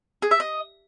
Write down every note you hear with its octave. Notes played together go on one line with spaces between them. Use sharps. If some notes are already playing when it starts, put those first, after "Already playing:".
G#4
E5
D#5